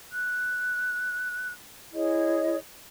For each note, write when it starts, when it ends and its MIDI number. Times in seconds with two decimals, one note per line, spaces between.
0.11 1.50 90
1.94 2.56 64
1.94 2.56 68
1.94 2.56 73
1.94 2.56 75